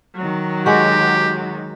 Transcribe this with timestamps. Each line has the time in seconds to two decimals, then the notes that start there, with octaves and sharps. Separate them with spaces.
0.16 D#3 F#3
0.66 G#3 F#4 G4